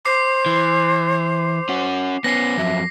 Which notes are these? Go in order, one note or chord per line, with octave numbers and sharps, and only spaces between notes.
C5 D6 C7
E3
C#4 F#4
B3 C#4 A#6 C7
F2 F#3 E5